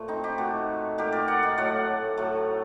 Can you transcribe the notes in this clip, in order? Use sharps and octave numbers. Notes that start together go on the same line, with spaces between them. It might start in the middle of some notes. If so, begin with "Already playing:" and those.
Already playing: A#2 A3 C5
C4 D#4
D#4 G4
A#2 A3 F#4 A4
A#2 A3 G4 A#4
A#4 D5
D5 F#5
D#5 G5
A2 F#3 A3 D5 F#5
A2 F#3 A3